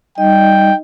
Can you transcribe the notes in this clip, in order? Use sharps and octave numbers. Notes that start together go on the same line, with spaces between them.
G3 D#4 D#5 G5